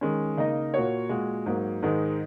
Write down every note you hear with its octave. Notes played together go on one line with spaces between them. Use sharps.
D#3 G#3 C#4
C#3 A#3 D#4 A#4 D#5
A#2 A#3 F#4 C#5
A#2 G#3 F#4
G#2 F#3 A#3
G#2 D#3 G#3 D#4